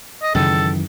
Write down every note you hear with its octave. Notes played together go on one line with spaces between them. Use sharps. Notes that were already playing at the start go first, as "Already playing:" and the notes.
D#5
C#2 F#2 D#3 E3 A4